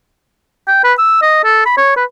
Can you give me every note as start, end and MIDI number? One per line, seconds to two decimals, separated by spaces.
0.68 0.83 79
0.84 0.93 71
0.98 1.20 88
1.22 1.40 75
1.44 1.63 69
1.66 1.74 83
1.77 1.94 73
1.96 2.04 71